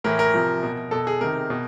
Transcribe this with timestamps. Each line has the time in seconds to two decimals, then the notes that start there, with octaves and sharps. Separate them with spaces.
0.04 A2 E3 A#4
0.19 A#4
0.34 C3 F3
0.63 B2
0.91 B2 A4
1.07 G#4
1.21 C3 D#3 A#4
1.50 B2